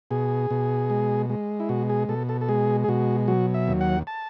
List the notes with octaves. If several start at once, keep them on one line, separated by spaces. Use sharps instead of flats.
B2 G#4
B2
G#3
G#3
E4
B2 F#4
G#4
B2 A4
A4
A4
G#3 G#4
G#4
B2 F#4
F#3 F#4
E5
D#2
F#5
A5